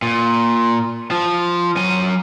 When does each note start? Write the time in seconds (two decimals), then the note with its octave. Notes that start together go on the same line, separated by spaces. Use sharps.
0.02 A#2
1.11 F3
1.76 F#3 G#5